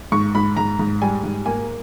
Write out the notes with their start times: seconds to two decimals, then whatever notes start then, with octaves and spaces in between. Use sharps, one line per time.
0.12 G#2 C#6
0.35 G#2 B5
0.56 G#2 A#5
0.79 G#2
1.02 G3 G#5
1.24 G#2
1.46 A#3 G#5